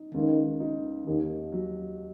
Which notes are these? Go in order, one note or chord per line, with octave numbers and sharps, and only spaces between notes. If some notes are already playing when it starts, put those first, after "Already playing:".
Already playing: D#4
C#2 D#3
D#4
D#2 D#3
F#3